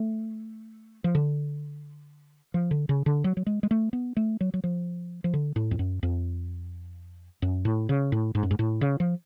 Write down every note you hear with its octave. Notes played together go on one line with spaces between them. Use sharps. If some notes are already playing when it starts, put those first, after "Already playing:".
Already playing: A3
F3
D3
F3
D3
C#3
D3
F#3
F#3
G#3
G#3
A3
B3
A3
F#3
F#3
F3
F3
D3
A2
F2
F#2
F2
F#2
A2
C#3
A2
G#2
F#2
G#2
A2
C#3
F3